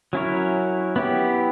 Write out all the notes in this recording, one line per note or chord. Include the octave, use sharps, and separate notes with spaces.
F#3 C#4 E4 A#4 C#5
B3 E4 G4